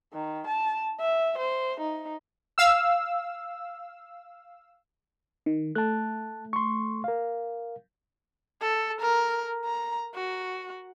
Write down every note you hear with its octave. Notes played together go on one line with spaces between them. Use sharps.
D#3
A5
E5
C5
D#4
F5 E6
D#3
A3 A5 F#6
C6 C#6
A#4 F5
A4
A#4
A#5
F#4